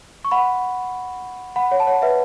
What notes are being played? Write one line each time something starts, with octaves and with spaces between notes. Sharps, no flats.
C#6
F#5 B5
F#5 B5
C#5 F#5
A5
C#5 F#5
B4 E5